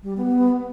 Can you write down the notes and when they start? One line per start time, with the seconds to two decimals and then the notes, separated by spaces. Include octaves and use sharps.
0.03 G3
0.17 B3